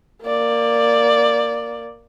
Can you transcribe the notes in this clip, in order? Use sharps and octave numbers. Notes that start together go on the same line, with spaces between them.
A#3 D5